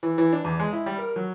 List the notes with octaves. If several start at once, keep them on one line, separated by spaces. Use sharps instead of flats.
E3
E3
D4
E2
G#3
E4
G3
A#4
F#3